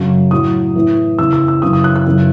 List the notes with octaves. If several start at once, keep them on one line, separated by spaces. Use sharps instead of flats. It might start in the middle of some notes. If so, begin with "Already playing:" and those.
Already playing: F#2 C#3 F#3
A2 F#3 D#6
A2 E3
E2 C#3 E3 E6
E6
E6
F#2 C#3 E3 D#6
D#6
F#6
F#6
F#2 C#3 E3